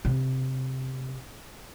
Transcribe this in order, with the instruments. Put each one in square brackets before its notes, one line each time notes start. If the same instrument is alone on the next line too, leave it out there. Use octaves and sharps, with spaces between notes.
[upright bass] C3